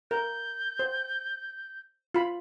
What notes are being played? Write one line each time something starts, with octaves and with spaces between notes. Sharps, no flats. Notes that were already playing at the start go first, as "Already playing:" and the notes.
A#4 G6
C5
F4 B5